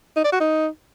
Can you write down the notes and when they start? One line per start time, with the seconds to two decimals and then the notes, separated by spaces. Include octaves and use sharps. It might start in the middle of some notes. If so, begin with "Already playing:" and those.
0.16 D#4
0.24 D5
0.32 F#4
0.40 D#4